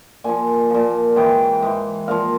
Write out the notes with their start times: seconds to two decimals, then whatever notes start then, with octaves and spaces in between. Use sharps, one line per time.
0.24 A#2 F3 G#5
0.70 A#2 F3
1.16 G#2 E3 G5
1.62 G#2 E3
2.08 A#2 F3 F5